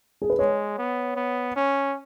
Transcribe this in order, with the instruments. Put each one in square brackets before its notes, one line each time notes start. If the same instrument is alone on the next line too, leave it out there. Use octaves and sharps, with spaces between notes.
[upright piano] G#4
B4
[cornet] G#3 [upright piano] C#5
[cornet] B3
B3
C#4